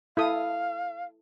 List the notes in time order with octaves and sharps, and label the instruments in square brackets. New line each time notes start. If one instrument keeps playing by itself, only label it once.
[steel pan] E4 A4 D#6 [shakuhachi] F5